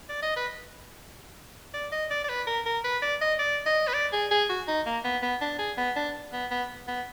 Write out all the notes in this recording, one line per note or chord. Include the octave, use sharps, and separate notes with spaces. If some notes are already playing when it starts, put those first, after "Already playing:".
D5
D#5
B4
D5
D#5
D5
D5
B4
A#4
A#4
B4
D5
D#5
D5
D#5
B4
D5
G#4
G#4
F#4
D#4
A#3
B3
B3
D4
G#4
B3
D4
B3
B3
B3